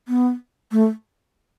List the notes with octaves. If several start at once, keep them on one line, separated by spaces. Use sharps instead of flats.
B3
A3